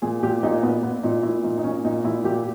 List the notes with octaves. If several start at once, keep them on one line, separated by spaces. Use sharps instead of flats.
A#2 G#4
A#2 G4
A#2 D#4
A#2 B3
A#2 B3
A#2 D#4
A#2 E4
A#2 D#4
D#4
A#2 C#4
A#2 D#4
A#2 E4
A#2 G4